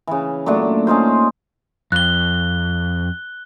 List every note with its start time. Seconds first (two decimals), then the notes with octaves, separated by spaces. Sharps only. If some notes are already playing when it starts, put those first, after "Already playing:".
0.07 C#3 E3
0.46 A#2 F#3 A3 D4
0.87 C#4 D#4 F4 C5
1.92 F2 F#6 G7